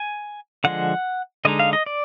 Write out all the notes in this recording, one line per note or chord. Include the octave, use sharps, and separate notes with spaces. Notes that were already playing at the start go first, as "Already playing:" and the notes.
Already playing: G#5
D3 F3 G#3 F#5
D3 G#3 D#4 D#5
F5
D#5
D5